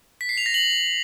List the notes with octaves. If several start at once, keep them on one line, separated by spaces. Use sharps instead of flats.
B6
C7
F7
A#6
F#7